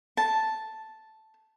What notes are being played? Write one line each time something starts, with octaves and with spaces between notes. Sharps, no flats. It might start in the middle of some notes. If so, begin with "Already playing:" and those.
A5